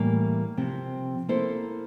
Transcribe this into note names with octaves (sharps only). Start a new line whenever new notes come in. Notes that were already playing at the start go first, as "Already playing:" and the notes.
Already playing: A2 E3 G3 A#3
C3 F3 C4
A#3 E4 A4 C5